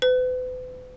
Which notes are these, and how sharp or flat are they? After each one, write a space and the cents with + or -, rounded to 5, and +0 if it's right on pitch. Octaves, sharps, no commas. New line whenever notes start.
B4 +40